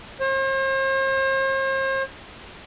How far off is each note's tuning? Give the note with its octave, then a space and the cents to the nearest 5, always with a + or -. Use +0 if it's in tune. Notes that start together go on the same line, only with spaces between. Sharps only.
C5 +45